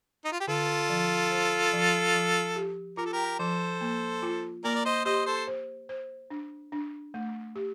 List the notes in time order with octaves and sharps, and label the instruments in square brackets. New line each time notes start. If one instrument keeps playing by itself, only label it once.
[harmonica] D#4
F4
G4
[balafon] D3 [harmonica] F4 A4
[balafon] F3
C5
F3
F3
G4
[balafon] F4 [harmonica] A#4
[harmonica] A4
G4 A#4
[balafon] F3 [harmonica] A4 C5
[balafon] A#3
F4
[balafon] A#3 [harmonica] A#4 D5
[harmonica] D5
C5 D#5
[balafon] G4 [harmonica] C5 D#5
[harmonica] A4 C5
[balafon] C5
C5
D4
D4
A3
G4